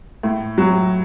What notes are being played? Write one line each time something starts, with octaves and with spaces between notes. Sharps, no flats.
A2
F#3